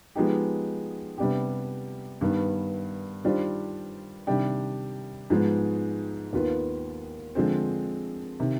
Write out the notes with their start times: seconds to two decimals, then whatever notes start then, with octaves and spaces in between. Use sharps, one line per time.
0.16 F3 G#3 B3 D#4 G4
1.18 C3 G3 B3 D4 G4
2.21 G2 D#3 B3
3.24 D#3 G3 D4 F4 C5
4.27 C3 D#3 G3 D4 G4
5.30 G#2 F3 G#3 B3
6.33 D#2 D#3 B3 F4 B4
7.35 D3 F3 G#3 C4
8.40 C3 D#3